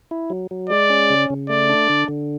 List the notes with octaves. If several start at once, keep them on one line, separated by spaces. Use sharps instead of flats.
E4
F#3
F#3
G#3 D5
C#4
C#3
C#3
A3 D5
D4
D3
D3